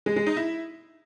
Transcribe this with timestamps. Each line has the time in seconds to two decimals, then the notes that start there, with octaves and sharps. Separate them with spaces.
0.06 G#3
0.16 G#3
0.26 D#4
0.37 E4